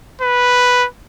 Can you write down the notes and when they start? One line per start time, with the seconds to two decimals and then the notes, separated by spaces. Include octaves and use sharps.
0.21 B4